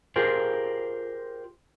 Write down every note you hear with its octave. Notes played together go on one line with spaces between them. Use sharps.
F4 G4 G#4 A#4 C5